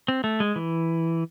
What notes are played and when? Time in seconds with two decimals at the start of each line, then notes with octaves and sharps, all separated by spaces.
0.08 C4
0.24 A3
0.40 G#3
0.56 E3